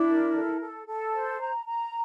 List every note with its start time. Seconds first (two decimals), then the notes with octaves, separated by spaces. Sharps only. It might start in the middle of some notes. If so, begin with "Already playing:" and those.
Already playing: D4 E4
0.08 A#4
0.34 A4
0.61 A4
0.86 A4
1.12 C5
1.39 A#5
1.65 A#5